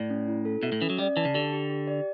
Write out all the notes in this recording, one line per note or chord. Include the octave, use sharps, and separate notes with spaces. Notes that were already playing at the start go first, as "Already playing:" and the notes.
Already playing: A2 D5
C#4
E4
A4
B2 E5
A2
E3 C#4
F#3
G3 D5
E3 A5
C#3
D3 G4
G4
G4
D5